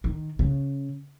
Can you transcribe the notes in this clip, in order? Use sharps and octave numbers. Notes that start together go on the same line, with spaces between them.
D#3
C#3